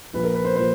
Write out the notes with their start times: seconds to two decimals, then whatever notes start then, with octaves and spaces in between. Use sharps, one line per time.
0.13 A#1 A#2 F3 B4
0.24 A#4
0.34 B4
0.45 C5
0.56 A#2 F3 C5